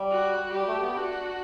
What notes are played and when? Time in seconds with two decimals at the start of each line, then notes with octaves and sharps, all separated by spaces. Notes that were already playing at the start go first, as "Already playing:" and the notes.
Already playing: G3
0.10 F#4
0.53 G3 G4
0.67 A3
0.82 B3
0.96 D4 F#4